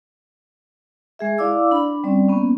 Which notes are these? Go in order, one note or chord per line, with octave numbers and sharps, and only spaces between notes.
G#3 G#4 E5
E4 D5 F5 D6 E6
D4 B5
G3 C4 C#4 D5
A#3 B3 C#4